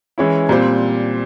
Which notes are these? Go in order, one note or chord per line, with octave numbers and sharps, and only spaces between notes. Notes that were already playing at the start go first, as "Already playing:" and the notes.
E3 G#3 C#4 E4
A#2 G3 C4